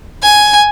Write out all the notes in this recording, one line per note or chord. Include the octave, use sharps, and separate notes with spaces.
G#5